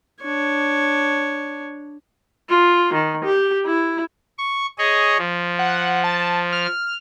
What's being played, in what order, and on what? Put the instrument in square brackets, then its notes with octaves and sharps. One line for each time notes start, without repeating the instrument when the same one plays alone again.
[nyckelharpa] D4 C#5
[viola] F4
D#3
G4
E4
[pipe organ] C#6
G#4 C#5 D#5
F3
[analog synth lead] F#5
A5
F6